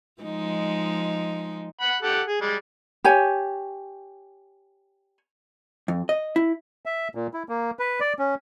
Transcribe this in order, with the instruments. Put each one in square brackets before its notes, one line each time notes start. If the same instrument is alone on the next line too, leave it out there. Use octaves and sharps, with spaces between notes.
[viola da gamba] F3 G#3 D#4
[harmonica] F#5 B5
G4 A4 F#5
G#4
G3 G#3
[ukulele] G4 C#5 G#5
[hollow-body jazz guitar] F2
D#5
E4
[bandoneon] E5
A#2
E4
A#3
B4
D5
C#4